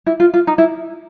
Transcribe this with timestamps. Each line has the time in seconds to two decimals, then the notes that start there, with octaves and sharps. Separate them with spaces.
0.06 E4
0.20 F4
0.34 F4
0.47 D#4
0.58 E4